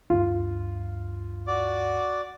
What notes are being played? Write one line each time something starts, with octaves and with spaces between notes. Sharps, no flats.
D2 G2 F4
F#4 D5 D6